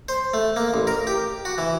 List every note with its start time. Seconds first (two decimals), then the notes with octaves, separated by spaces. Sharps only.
0.09 C5
0.34 A3
0.56 A#3
0.74 A1
0.87 A#4
1.07 G4
1.45 F#4
1.58 E3